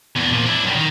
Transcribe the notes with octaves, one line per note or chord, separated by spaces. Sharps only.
E2 D4
A#2 F3
D4 E4
F#2 G3
D#3